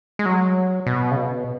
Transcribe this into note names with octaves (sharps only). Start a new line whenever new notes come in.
G#3
F#3
B2
C#3
B2